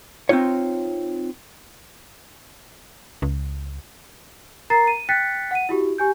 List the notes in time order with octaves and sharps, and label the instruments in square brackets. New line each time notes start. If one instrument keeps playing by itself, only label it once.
[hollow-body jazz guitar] C4 C#4 D#4 F4 C#5
[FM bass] C#2
[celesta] A#4 A#5 A6 C7
D#7
G5 F#6 A6 B6 C#7
F#5 D#7
E4 F#4 G4
G4 G#5 G6